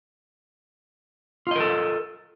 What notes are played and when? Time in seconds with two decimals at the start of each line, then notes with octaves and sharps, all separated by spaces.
1.47 F4
1.51 D#5
1.56 A#4
1.60 A4